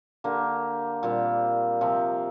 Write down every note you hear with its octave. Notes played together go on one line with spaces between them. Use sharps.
D3 A#3 G4
A#2 G3 C4
C3 F3 C4